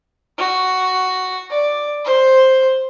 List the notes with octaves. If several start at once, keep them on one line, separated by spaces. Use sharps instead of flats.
F#4
D5
C5